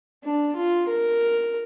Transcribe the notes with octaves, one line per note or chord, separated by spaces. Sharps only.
D4
F4
A#4